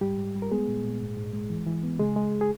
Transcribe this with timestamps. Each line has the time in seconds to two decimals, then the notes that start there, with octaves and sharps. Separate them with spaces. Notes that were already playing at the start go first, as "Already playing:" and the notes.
0.01 G#2 G3 G4
0.18 G#2
0.35 G3
0.42 A#4
0.51 G#3 B3 G#4
0.68 A#2
0.84 A#2
1.01 G#2
1.17 G#2
1.33 G#3
1.50 E3
1.66 E3
1.84 B3
1.99 C#3 G#3 G#4
2.16 G#3
2.41 G#4